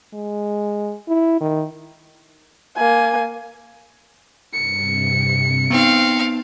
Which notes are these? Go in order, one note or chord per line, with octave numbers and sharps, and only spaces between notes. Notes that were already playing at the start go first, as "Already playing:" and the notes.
G#3
E4
D#3
A#3 G#5
G2 C3 C#7
B3 C4 D#4 F5 A5